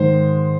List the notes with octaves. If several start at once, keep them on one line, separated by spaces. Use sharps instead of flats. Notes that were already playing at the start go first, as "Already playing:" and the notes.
Already playing: G#2 D#3 G#3 C5